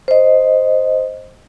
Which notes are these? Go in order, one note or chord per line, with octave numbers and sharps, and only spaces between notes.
C5 D#5